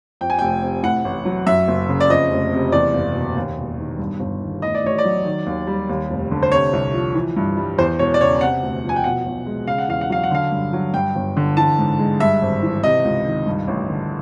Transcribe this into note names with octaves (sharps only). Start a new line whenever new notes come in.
F2 G5
G#5
F1 G5
C3
A2 F#5
A1
F#3
F#2 E5
F#1
C#3
D5
F2 D#5
F1
C3
E2 D5
F#1
B2
D#2
E1
D#3
G2
G1
D#3
A2 D#5
D5
A1 C#5
D5
F#3
D#3
D#2
G3
D#2
F1
D3
C5
C3 C#5
C2
F3
E3
G2
G3
E2 C5
E1 C#5
D5
C#3 C#5
C3 F#5
D2
F3
G#5
G5
B2 F#5
B1
G#3
C#3 F5
F#5
E2 F5
F#5
F#3 F5
F#5
D3 F5
G2
F#3
G2 G5
G1
D3
E3 A5
G#2
G#3
G2 E5
G#1
E3
C3 D#5
C#2
D#3
G2
A1
D3